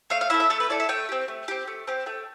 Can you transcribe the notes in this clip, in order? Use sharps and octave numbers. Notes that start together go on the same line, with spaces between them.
A3 F5
F5
E4 A4 E5
E5
A3 A4
B4
E4 A4 D5
E5
A3 G5
C4 G4
A3
C4 G4
A3
C4 G4
A3 G5